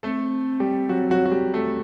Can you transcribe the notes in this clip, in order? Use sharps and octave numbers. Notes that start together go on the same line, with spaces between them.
A3 C4 A4
G3 G4
F#3 F#4
F#3 F#4
F#4
G3 G4
A3 A4